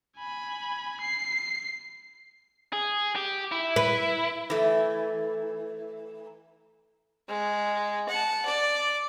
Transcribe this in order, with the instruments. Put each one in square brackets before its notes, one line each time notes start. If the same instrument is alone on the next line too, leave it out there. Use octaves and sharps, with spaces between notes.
[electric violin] G#5 B5
C7
[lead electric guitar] G#4
G4
E4
[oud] B4
[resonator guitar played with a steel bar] E3 A3
[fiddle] G#3
F#5 A5
D5